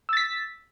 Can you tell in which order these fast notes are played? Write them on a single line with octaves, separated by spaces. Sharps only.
E6 A6 B6